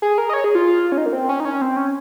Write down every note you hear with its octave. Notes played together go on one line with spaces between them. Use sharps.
G#4
A#4
D#5
C#5
G#4
F4
C#4
D#4
A#3
C4
C#4
D#4
C#4
C4
C#4